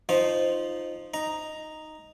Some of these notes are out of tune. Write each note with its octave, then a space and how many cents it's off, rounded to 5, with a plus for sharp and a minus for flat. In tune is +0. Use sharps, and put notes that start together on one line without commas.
F3 +0 D#4 -10 C5 +0
D#4 +0 A#5 +0